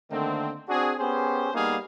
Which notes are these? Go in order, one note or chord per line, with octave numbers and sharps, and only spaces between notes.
D3 D#3 A3 A#3 C4
C4 D4 F#4 G#4
B3 C#4 G4 G#4 C5
G3 A#3 B3 D#4 G#4 F5